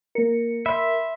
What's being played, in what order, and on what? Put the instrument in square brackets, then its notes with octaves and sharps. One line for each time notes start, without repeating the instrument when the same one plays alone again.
[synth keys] A#3 C#7 [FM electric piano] A#4
[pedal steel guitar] E5 [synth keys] B5 C6